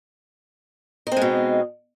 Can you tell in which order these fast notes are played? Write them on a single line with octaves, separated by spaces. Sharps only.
D#4 C4 G#3 B2